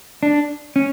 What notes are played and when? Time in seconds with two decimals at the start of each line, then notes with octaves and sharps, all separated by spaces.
0.23 D4
0.76 C#4